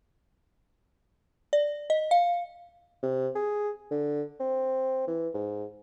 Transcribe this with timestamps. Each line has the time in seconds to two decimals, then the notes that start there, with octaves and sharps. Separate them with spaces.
1.53 D5
1.90 D#5
2.11 F5
3.03 C3
3.35 G#4
3.91 D3
4.40 C4
5.07 E3
5.34 G#2